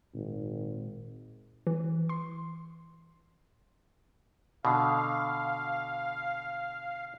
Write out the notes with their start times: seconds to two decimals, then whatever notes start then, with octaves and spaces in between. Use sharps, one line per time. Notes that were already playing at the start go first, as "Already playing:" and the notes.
0.14 G#1 A#2
1.67 E3
2.09 C6
4.65 B2 D3 F5